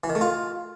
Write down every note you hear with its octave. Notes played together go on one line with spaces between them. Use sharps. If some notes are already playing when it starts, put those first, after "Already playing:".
E3
D#3
A3
F4